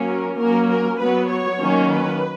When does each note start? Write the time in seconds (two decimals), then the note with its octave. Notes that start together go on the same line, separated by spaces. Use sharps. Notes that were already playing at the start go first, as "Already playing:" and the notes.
Already playing: F#3 A#3 C#4
0.09 A#4
0.39 F#3 A#3 C#4 A#4
0.70 A#4
1.00 F#3 B3 B4
1.31 C#5
1.61 D#3 F#3 A#3 C#4
1.92 B4